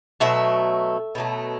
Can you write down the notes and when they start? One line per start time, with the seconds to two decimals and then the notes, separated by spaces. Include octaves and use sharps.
0.20 B2 F#3 A3 E5
1.15 B2 F#3 A3